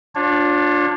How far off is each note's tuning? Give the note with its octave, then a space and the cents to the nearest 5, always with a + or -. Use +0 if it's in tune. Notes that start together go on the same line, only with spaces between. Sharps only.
D4 +0 F4 +35 C#5 -40